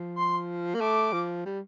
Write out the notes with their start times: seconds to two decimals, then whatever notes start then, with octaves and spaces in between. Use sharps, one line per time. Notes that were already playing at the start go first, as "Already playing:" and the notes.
Already playing: F3
0.16 C6
0.74 A#3
0.80 A3 D6
1.13 F3
1.45 G3